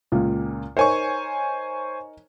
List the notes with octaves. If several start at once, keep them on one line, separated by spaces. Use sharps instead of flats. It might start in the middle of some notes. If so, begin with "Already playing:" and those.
C#2 A#2 F4
D#4 A#4 C5 C#5 G#5 C#6